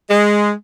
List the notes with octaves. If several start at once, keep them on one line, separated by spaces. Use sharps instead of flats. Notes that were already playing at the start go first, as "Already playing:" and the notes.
G#3